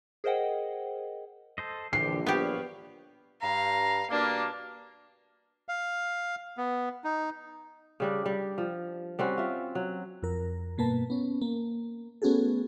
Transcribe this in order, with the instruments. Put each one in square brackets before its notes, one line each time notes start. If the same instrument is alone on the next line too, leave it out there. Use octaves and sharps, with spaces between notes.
[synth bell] G#4 A#4 C5 D#5 F#5 G5
[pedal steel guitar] A4 C5 D#5
[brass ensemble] A#1 G3 [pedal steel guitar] D3 E3 G4 [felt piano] C7
[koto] B3 G4 [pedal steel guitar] B4 C#5 F5
[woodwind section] G2 A#5 [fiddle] F5
[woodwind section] B2 G3 A#3 [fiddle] D4
[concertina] F5
B3
D#4
[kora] C#3 G3 D4
G3
F3
G3 C4 C#4 F#4
F4 E5
F#3
[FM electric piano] F2 A#4
G2 B2 A#3 B4 A5
B3 C#4
A#3
A3 B3 C#4 F#4 G#4 A4